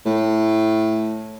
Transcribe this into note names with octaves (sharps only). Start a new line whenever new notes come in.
A2